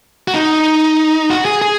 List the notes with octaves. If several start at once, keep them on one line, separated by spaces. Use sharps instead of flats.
F#4
D#4
F#4
G#4
G#4